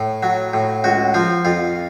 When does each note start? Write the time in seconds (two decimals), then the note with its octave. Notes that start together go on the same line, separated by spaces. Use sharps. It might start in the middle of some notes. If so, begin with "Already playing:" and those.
Already playing: A2
0.23 F#3
0.53 A2
0.84 C#2 F#4
1.14 F3 F4
1.45 F2 F4